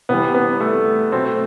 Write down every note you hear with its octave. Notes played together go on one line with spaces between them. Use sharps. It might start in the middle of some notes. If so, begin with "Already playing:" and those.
C3 E3 G3 B3
B3
A3
B2 F#3 A3 C4